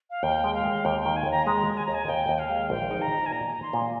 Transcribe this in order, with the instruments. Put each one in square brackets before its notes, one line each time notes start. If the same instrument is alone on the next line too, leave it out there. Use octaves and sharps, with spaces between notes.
[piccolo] F5
[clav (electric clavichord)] D#2 [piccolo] G5
[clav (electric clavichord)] G#3
[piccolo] F5
[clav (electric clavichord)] G#3
[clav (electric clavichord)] D#2 [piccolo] G5
[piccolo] G5
[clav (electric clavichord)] D#3
[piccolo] G#5
[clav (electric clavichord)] D#2 [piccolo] A#5
[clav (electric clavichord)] G#3 [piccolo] A#5
[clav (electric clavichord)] G#3
[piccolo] G#5
[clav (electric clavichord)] D#2 [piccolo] A#5
[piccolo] G#5
[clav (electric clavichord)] D#2 [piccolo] G5
[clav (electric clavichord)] D#2
[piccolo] F5
[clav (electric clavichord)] G#3
[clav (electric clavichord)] A#1 [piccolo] G5
[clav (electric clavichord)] D#4
[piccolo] A#5
[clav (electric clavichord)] D#4
[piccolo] G#5
[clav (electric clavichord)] A#2 [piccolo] A#5
[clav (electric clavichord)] D#4
[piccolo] C6
[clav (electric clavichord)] A#2